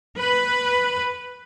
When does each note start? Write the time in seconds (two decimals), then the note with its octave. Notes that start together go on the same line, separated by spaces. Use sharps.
0.17 B4